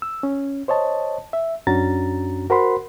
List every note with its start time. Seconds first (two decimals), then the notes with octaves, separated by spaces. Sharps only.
0.02 E6
0.23 C#4
0.68 C5 C#5 D#5 A5
1.33 E5
1.67 F#2 C#4 D4 F#4 A#5 A6
2.50 F#4 A#4 C5 F#5 B5 C6